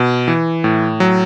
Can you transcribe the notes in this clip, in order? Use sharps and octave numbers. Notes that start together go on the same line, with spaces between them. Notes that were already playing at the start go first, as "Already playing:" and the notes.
Already playing: B2
E3
A2
F#3